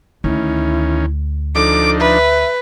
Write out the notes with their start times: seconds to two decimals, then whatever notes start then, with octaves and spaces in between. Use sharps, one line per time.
0.24 D2 D#3 C#4 E4
1.55 F3 D4 D#4 A4 D6
2.00 B4 E5